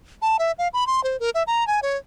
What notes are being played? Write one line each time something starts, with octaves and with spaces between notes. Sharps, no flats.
A5
E5
F5
B5
C6
C5
A#4
E5
A#5
G#5
C#5